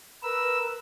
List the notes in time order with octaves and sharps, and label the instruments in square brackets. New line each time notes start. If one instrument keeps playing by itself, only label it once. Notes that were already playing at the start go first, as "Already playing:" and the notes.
[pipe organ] A#4 B4 E6